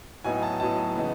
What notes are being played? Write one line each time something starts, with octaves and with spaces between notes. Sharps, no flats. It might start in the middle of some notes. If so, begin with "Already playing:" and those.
A2 F#3 B3 D#4 G#5
A5
A2 F#3 B3 D#4 A5
C#3 E3 B3 D#4